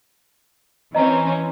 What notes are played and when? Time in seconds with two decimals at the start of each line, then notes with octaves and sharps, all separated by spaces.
0.95 E3 C4 C#4 D#5 A#5